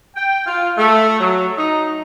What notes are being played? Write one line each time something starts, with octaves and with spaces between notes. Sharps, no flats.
G5
F4
A3
F#3
D#4